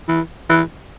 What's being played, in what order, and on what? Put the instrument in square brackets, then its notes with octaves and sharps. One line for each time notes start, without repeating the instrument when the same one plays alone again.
[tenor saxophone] E3
E3